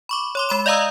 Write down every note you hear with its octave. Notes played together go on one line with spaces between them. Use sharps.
B5 C#6 D6
C#5 C6 D6
G#3 B5 E7
D5 D#5 F5 A#5 D#6 E6